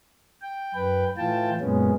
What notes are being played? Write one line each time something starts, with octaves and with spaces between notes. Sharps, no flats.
G5
F#2 B4 G5
A2 E3 F4 G5 A5
F#2 A#2 G#3 B3 C#4